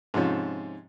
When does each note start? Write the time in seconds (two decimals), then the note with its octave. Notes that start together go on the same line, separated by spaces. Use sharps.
0.14 G#2 C3 F3 C#4